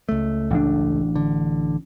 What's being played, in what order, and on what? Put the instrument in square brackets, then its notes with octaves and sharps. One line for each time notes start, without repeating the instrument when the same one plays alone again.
[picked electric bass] C#2 A3
[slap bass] A1 D4
[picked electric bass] D3